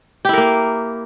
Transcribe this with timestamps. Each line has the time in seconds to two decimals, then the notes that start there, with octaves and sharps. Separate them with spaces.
0.25 G4
0.29 E4
0.33 A#4
0.38 A#3